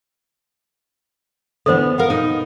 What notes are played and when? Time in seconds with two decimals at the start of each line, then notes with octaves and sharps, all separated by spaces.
1.66 D3 E3 B3 A4 C5
1.98 A#4 F5 F#5
2.10 B2 D#4